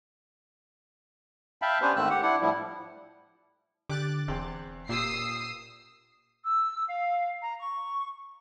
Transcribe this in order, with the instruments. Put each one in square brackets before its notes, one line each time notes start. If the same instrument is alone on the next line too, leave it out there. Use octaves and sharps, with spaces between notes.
[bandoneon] E5 F5 G5 A5 B5
B3 C#4 D4 G4 B4 C5
G#2 D#3 A3 C4 E6 F#6
G4 F#5
D4 E4 F#5
A2 F3 G3 E4
[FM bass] D3 [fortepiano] G4 [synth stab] D6 F#6 A6
[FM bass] E1 [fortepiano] E2 C4 G5
[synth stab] A#2 [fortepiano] G4 [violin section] D#6 E6 C7
[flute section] E6
F5
A#5
C#6